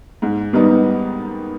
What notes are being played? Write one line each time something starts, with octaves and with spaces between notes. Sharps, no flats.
G#2
D#3 G3 B3 D#4